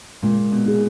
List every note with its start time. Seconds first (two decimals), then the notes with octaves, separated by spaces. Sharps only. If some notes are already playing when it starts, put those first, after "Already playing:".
0.23 A#2 G#3
0.52 B2
0.66 D#4 G#4